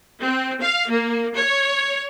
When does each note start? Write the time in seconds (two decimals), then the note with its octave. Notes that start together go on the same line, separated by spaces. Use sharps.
0.23 C4
0.61 F5
0.90 A#3
1.36 C#5